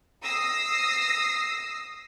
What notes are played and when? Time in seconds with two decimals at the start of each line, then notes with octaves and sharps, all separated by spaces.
0.23 D#6 E6 A#6 C7